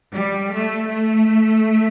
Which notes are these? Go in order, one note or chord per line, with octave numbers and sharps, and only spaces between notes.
G3
A3
A3